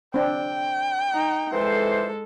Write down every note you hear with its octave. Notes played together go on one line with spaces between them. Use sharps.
C4 D4 G5
D#4
F2 E3 G#3 A4 C5